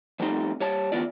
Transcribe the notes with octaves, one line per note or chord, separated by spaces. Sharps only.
F3 G3 A3 C4 D#4 C6
G3 C#5 A5
D2 E3 B3 F4 D5